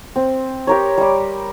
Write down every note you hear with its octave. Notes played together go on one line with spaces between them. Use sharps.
C4
G4 A#4 C#5
G3 D6